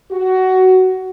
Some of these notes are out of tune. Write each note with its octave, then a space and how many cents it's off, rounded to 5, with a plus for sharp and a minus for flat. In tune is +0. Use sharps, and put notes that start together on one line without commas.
F#4 +15